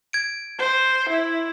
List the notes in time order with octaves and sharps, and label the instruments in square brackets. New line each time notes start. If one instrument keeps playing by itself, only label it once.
[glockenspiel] G#6 D7
[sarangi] C5
E4